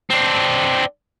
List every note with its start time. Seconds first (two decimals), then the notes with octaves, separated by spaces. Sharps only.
0.10 C4 D4